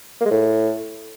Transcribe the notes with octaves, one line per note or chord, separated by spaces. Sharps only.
A#3
G#3
A2